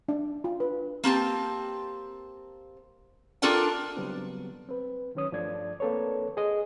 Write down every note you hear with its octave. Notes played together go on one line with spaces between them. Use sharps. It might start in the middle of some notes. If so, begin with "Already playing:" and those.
D4
F4
B4
A#3 C4 G4 A5
D4 F4 A4 A#4 D5 G5
C#3 F#3 G3 B3 C4
C4 B4
D#3 F#3 C#4 C#5 D#6
G2 F3 A3 D4 D5 G#6
A#3 C4 A4 B4 C#5
G#4 D#5